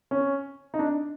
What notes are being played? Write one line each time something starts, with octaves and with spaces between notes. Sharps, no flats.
C#4
D#4
D4